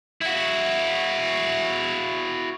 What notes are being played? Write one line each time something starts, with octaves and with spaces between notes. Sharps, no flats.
E4 F#4